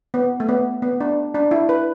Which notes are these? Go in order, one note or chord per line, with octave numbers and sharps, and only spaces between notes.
B3
A3
B3
B3
D4
D4
E4
B4